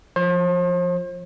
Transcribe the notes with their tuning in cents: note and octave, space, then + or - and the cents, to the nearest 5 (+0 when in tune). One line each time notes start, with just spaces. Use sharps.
F3 +0 C5 +40